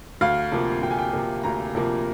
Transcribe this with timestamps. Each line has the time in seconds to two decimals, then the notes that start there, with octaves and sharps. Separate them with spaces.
0.21 D2 F5
0.52 C3 F3 A#3
0.82 D2 G5
0.91 G#5
0.99 G5
1.13 C3 F3 A#3
1.44 D2 A#5
1.75 C3 F3 A#3